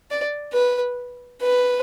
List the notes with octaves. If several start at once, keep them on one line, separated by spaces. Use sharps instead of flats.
D5
B4
B4